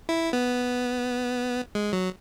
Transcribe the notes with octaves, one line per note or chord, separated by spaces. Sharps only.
E4
B3
G#3
F#3